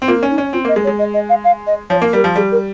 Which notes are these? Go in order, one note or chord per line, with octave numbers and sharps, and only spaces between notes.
C4
A#3 F4
C#4
D#4
C#4
C4 F4
A#3 D#5
G#3
C#5
G#3
D#5
D#5
F5
F5
D#5
F3 C#5
A#3
G3 A#4
F3
G3 G#4
A#4